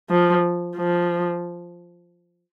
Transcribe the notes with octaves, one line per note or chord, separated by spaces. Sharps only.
F3
F3